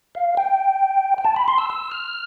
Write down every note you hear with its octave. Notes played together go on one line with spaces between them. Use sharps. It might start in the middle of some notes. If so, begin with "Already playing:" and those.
F5
G5
G5
A5
B5
C6
E6
E6
F6